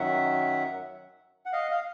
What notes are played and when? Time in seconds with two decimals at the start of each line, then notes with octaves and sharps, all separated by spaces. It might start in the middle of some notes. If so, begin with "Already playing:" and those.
Already playing: F#2 D#3 F#3 E5 F#5
1.45 F#5
1.52 D#5 F5
1.71 F5